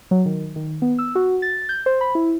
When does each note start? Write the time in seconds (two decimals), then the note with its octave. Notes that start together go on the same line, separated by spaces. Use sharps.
0.11 F#3
0.26 D#3
0.56 D#3
0.82 B3
0.99 E6
1.15 F#4
1.42 A6
1.69 G6
1.86 C5
2.01 B5
2.15 E4